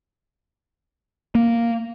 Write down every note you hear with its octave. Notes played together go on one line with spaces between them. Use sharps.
A#3